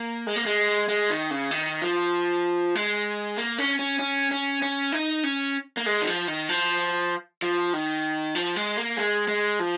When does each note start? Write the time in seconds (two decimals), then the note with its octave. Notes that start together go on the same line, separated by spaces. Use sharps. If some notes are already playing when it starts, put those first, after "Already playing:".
Already playing: A#3
0.27 G#3
0.36 A#3
0.46 G#3
0.88 G#3
1.10 D#3
1.31 C#3
1.51 D#3
1.82 F3
2.75 G#3
3.37 A#3
3.59 C#4
3.79 C#4
3.99 C#4
4.31 C#4
4.62 C#4
4.92 D#4
5.24 C#4
5.77 A#3
5.86 G#3
6.02 D#3
6.07 F3
6.27 D#3
6.49 F3
7.42 F3
7.73 D#3
8.35 F3
8.56 G#3
8.77 A#3
8.97 G#3
9.28 G#3
9.59 F3